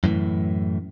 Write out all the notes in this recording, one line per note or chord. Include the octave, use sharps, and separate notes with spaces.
F#2 A2 D3 E3